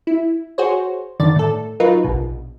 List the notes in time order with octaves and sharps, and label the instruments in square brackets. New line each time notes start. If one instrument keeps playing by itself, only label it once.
[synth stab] E4
F#4 G#4 C5 C#5
G2 D3 D#3 D5 A6
A2 A4
F#3 D#4 F4 A#4 B4
A#1 B2